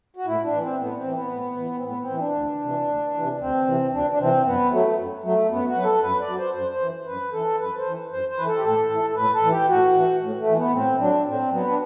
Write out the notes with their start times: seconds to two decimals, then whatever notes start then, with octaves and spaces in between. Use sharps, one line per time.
0.16 F#4
0.26 A2 E4
0.43 D4
0.52 E3
0.60 C4
0.78 A2 B3
0.96 C4
1.04 E3
1.13 B3
1.30 A2
1.57 E3
1.77 C4
1.83 A2 B3
2.00 C4
2.10 E3
2.18 D4
2.35 D2
2.61 C3 E3
2.88 D2
3.14 C3 E3
3.40 D2 C4
3.66 C3 E3
3.92 D2 D4
4.10 D4
4.18 C3 E3 C4
4.44 F#2 B3
4.71 F#3 A3
4.97 F#2
5.23 F#3 A3
5.49 F#2 B3
5.67 F#4
5.75 F#3 B4
5.84 A4
6.01 F#2 B4
6.20 D5
6.27 F#3
6.37 C5
6.54 F#2 C5
6.72 C5
6.80 E3
7.06 F#2 B4
7.32 E3 A4
7.59 F#2 B4
7.77 C5
7.85 E3
8.11 F#2 C5
8.29 C5
8.37 E3 B4
8.46 A4
8.56 G4
8.64 A2 A4
8.90 E3
9.10 A4
9.15 A2 B4
9.33 A4
9.42 E3
9.51 G4
9.69 A2 F#4
9.94 E3
10.21 A2
10.38 A3
10.47 E3
10.56 B3
10.73 A2 C4
10.99 F#3 D4
11.26 A2 C4
11.52 F#3 B3
11.69 D4